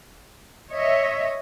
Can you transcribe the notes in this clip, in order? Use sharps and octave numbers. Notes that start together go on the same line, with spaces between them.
C#5 D#5 E5